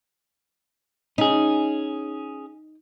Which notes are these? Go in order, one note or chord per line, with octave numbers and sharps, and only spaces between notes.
C#4 D#4 G#4